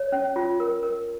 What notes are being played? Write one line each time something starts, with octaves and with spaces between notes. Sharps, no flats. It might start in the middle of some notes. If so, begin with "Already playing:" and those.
Already playing: C#5
C#4
F4
A#4
A#4